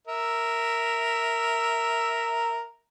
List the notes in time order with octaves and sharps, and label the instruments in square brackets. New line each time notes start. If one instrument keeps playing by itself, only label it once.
[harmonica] A#4 E5